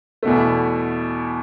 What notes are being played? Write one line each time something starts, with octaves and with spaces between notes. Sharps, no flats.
E2 B2 A3